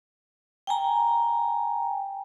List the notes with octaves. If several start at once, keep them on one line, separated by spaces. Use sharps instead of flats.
G5 G#5 A#5